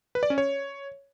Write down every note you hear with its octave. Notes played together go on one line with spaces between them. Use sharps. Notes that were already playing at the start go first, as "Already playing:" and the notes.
B4
D5
C#4
C#5